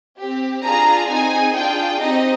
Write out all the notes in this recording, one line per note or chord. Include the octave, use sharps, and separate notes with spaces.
C4 G4
D4 F4 G#4 A#5
C4 D#4 G#4 G#5
D4 F4 G#4 G5
C4 D#4 G4 D#5